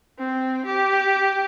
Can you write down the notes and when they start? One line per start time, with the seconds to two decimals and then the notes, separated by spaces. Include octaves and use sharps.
0.19 C4
0.65 G4